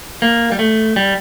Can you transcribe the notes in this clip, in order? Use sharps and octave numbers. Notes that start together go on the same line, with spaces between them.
A#3
G3
A3
G3